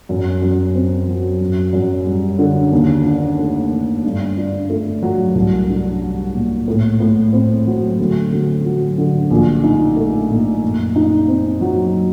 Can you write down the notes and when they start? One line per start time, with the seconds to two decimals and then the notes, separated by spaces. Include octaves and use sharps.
0.09 F#2
0.42 F#2
0.75 C4
1.08 F#3
1.41 F#2
1.73 F#2
2.06 G3
2.39 D3
2.72 D#2
3.05 D4
3.38 A3
3.71 D#3
4.04 G2
4.37 D4
4.70 A3
5.03 F#3
5.35 C2
5.69 D4
6.01 G3
6.34 A#2
6.68 A2
7.00 A2
7.33 C4
7.67 F#3
7.99 D2
8.32 D2
8.65 F#3
8.98 D3
9.31 A#1
9.64 D#4
9.97 A3
10.29 A#2
10.63 F#2
10.96 D#4
11.28 C4
11.61 F#3